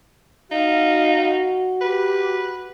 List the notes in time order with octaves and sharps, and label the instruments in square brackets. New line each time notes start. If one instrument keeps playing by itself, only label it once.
[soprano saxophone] D#4 [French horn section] F#4 [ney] F5
[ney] G4 [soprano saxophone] B4